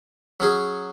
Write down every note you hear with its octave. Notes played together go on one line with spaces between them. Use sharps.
F#3 C#4 G#4